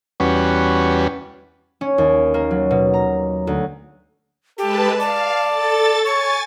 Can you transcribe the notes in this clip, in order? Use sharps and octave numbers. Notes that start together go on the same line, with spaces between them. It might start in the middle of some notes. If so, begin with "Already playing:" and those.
E2 G3 C#4 F#4 B4
C#4
D#2
A#3
F#3
B2
A#5
D2
G#3 G4 A4 B4 A5
D5 F5 A5
A4 A6
C#5 G#5 C#6 A6